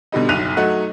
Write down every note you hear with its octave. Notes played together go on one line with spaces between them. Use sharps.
B2 D3 G3 D#4
F#1 B1 F#6 D#7 F7
F#3 A3 D#4 F#5